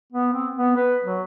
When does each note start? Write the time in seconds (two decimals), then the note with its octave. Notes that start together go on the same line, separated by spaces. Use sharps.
0.12 B3
0.32 C4
0.58 B3
0.76 B4
1.04 F#3